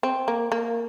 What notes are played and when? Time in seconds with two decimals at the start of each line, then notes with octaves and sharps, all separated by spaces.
0.03 C4
0.28 A#3
0.52 A#3